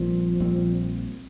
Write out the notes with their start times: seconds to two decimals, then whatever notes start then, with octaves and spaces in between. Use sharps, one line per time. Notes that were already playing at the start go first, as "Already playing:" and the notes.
Already playing: A#1 A#2 F3 G3 C4
0.40 A#1 A#2 G3 C4